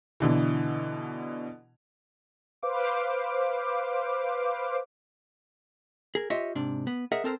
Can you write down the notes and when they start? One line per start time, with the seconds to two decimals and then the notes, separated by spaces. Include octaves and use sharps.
0.20 B2 D3 E3
2.62 B4 C5 F5 D6
6.15 G#4 A#4
6.30 F4 G4 C#5 D#5 E5
6.55 G#2 C3 D4
6.87 B3
7.12 G#4 A#4 D#5 E5 F#5
7.24 C4 A4 A#4 C5